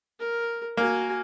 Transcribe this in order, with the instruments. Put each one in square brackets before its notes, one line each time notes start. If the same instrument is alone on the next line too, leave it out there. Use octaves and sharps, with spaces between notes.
[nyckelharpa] A#4
[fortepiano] A#3 [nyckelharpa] F#4 G#5